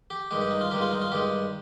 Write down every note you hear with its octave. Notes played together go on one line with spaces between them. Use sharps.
G4
G2 D#3 G#3 G4
G4
D#4
F4
G2 D#3 G#3 G4
F4
D#4
F4
G2 D#3 G#3 G4